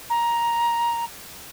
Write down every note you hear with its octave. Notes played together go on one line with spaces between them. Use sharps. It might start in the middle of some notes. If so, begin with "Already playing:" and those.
A#5